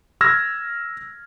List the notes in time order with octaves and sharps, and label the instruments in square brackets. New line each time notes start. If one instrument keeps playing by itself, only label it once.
[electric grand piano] E6 F6 G#6 A#6